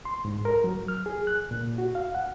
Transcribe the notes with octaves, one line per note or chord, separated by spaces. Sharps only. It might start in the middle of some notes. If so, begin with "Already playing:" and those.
C6
G#2
A#4
F#3
F6
G#4
F#6
A#2
F#4
F5
F#5